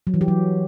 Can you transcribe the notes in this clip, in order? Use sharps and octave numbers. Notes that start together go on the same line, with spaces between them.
F#3
E3
G4
F#3